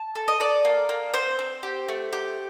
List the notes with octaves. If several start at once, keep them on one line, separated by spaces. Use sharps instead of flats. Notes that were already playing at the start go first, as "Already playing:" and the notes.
Already playing: A5
A4
D#5
A4 D5
A#3
A#3
C4 C5
C4
G4
A3
G4